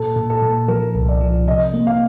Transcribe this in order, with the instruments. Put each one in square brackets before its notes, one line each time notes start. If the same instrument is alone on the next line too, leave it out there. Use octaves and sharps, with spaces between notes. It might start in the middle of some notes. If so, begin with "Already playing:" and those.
Already playing: [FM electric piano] A#2 [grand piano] A4
[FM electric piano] A#2
[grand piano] A4
[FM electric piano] A#2
[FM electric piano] F3 [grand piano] A#4
[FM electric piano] C2
[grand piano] D5
[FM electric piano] F3
[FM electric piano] C3 [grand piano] D#5
[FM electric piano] A#3
[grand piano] F5